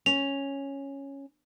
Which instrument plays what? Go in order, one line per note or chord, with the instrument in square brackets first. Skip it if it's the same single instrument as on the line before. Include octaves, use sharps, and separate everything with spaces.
[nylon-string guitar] C#4 [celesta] F7